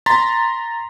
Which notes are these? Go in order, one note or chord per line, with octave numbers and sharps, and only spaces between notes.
A#5 C6 A6 B6